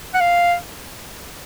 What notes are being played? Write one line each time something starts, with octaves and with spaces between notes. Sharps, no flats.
F#5
F5